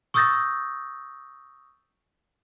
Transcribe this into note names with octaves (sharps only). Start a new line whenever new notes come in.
C#6 D#6 E6 G6 A6 A#6